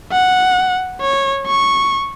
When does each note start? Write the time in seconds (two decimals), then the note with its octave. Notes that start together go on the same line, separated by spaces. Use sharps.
0.12 F#5
1.01 C#5
1.46 C#6